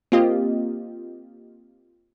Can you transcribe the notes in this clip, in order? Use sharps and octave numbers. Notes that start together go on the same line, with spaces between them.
A#3 C4 F4 G4 D#5